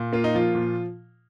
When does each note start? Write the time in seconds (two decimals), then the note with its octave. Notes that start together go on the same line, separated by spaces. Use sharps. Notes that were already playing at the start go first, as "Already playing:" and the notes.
Already playing: A#2
0.13 A#3 F4
0.24 D#4
0.34 F3 F4
0.55 A#2